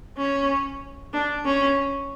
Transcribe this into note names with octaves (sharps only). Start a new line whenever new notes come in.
C#4
D4
C#4